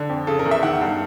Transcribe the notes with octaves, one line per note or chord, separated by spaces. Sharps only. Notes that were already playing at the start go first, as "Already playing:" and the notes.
Already playing: D3
F2
C#3 A4
A#4
E2
E5
D#3 F#5
G2